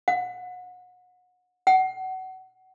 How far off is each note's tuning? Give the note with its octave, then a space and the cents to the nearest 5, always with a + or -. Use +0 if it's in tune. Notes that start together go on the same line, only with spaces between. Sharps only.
F#5 -30
F#5 +25